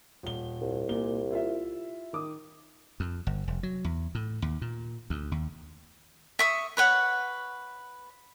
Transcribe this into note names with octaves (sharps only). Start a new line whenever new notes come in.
D#1 G7
C2
A#2 G7
E4 F4 E5
D#3 D6 D#6
F2
G1
F1
F#3
E2
A2
D#2
A#2
D2
D#2
E5 C#6 D#6
B4 C#5 F#5